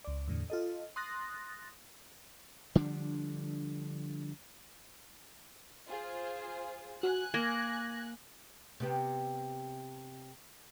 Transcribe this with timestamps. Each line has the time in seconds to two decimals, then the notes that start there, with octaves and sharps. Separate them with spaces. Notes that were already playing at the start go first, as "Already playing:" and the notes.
0.04 C#2 D5
0.28 E2 A2 D3
0.50 F4 A4 D#5
0.96 C6 D#6 F#6 A6 A#6
2.75 D3 F3 G3 D4
5.89 F4 G#4 C5
7.03 F#4 G#5 F#6
7.34 A#3 G#6 A#6
8.80 C3 B3 G4